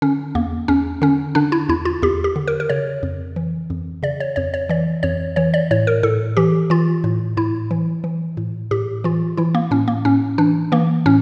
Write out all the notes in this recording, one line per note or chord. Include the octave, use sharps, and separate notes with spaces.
D3 C#4
E2 A#3
E2 C#4
D3 C#4
D3 D4
E4
E2 E4
F4
E2 G4
G4
D3
A#4
A#4
C#3 C#5
F2
E3
F2
C#3 D5
C#5
F2 C#5
C#5
E3 D5
F2 C#5
E3 C#5
D5
A2 C#5
A#4
A2 A4
E3 G4
E3 F4
A2
A2 E4
E3
E3
A2
A2 G4
E3 F4
E3 E4
A#3
A2 C#4
A#3
A2 C#4
E3 D4
E3 A#3
A2 C#4